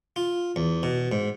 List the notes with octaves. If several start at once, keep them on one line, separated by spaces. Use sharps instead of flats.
F4
E2
B2
G#2